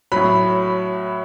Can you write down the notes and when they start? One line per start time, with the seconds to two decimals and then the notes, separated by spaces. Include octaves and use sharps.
0.12 A2 F#3 B5